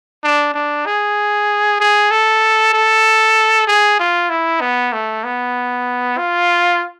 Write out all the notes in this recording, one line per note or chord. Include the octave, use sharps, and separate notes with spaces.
D4
D4
G#4
G#4
A4
A4
G#4
F4
E4
B3
A3
B3
F4